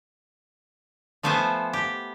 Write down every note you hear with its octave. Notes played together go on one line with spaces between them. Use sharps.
F3 A3 B3 C5 E5 G#5
G4